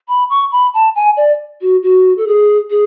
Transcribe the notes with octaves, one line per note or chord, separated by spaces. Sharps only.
B5
C#6
B5
A5
G#5
D5
F#4
F#4
A4
G#4
G#4